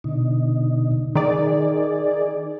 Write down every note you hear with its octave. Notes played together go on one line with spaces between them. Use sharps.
B2 D3 D#4
D#3 D#4 G#4 D5